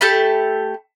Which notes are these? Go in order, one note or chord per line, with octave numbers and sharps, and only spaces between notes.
A3 G4 A5 B5